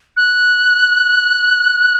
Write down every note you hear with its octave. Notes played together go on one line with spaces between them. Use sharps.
F#6